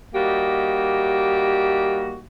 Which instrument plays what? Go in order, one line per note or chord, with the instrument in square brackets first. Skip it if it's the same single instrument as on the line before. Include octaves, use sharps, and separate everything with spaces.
[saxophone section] G3 A#3 D#4 F#4 G4